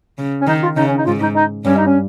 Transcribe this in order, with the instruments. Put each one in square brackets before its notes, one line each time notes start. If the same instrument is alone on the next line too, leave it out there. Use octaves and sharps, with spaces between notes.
[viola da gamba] C#3
[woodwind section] C#4
[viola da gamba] D#3 [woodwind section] D#4
[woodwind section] F4
[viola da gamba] C#3 [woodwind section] D#4
[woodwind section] C#4
D#4
[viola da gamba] G#2 [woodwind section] F4
[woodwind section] D#4
D#4
[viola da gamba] G2 [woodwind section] C#4
[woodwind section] D#4
C#4